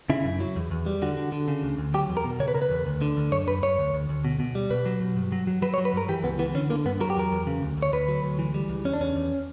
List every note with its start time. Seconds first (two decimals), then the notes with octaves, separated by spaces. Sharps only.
0.10 C#3 E4
0.25 F#2
0.40 F#3
0.56 E2
0.71 E2
0.86 G3
1.02 D3 F#4
1.17 D3
1.32 D3
1.48 C#3
1.63 D2
1.78 D2
1.94 F#3 G4
2.09 E2
2.17 A#4
2.24 B2
2.40 C#3 C#5
2.48 B4
2.55 C#3 A#4
2.62 B4
2.71 E2
2.86 D2
3.02 D3
3.17 D2
3.32 F#2 C#5
3.47 F#2 B4
3.63 F#2 C#5
3.78 D2
3.94 D2
4.09 D2
4.25 B2
4.40 B2
4.55 G3
4.71 B2 B4
4.86 F#3
5.01 B2
5.17 G2
5.32 F#3
5.47 F#3
5.62 F#3 B4
5.74 C#5
5.78 F#3
5.85 B4
5.93 G2 A#4
6.08 E3 G4
6.24 C#2 B3
6.39 E3 B3
6.55 D3 C#4
6.70 D3 A#3
6.85 G2 B3
7.01 F#3 A#4
7.10 G4
7.17 E2 A#4
7.32 E2
7.47 C#3
7.62 D2
7.77 D2
7.83 C#5
7.93 D2 B4
8.08 F#3
8.24 D2
8.39 E3
8.54 G3
8.70 C#2
8.85 E2 C#4
8.93 D4
9.00 E2 C#4
9.16 E2